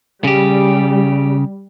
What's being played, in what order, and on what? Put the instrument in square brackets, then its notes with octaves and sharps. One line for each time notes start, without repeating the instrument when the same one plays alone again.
[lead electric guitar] C#3 G4 [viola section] G3